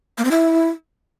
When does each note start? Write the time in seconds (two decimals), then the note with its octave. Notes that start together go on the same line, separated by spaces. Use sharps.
0.18 A#3
0.25 C4
0.31 E4